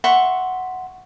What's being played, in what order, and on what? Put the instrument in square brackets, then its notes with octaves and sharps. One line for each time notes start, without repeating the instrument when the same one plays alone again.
[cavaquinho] E5 F#5 C6 C#6